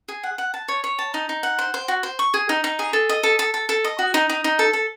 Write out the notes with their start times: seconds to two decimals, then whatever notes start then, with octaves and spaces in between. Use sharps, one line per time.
0.08 G#4
0.23 F#5
0.38 F#5
0.54 A5
0.68 C#5
0.84 C#5
0.99 A5
1.14 D#4
1.29 D#4
1.43 F#5
1.59 C5
1.74 C5
1.88 F#4
2.03 C5
2.19 C#6
2.34 G#4
2.49 D#4
2.64 D#4
2.79 G#4
2.93 A4
3.09 D#5
3.23 A4
3.39 A4
3.54 A4
3.69 A4
3.84 D#5
3.99 F#4
4.14 D#4
4.29 D#4
4.44 D#4
4.59 A4
4.73 A4